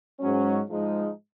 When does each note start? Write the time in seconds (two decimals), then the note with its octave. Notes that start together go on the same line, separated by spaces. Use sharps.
0.20 G#2 F#3 C#4
0.69 G#2 F3 G#3 D#4